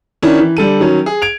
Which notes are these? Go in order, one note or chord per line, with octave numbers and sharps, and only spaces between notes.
D#3 C#4 D4 E4
E3
D3 G3 A4 D#7
D#3 F#3 C#4
G#4
G#6 D7 F7